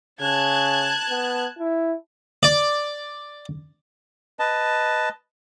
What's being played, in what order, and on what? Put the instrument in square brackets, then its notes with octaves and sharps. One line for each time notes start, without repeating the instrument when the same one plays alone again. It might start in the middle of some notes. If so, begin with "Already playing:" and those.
[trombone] C#3 [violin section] A5 F#6 G#6
[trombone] B3
E4
[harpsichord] D5
[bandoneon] B4 D#5 A5